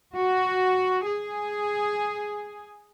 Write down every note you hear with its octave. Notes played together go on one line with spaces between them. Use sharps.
F#4
G#4